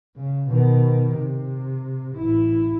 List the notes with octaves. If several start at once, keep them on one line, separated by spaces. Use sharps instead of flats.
C#3
B2 D#3
C3
A1 E4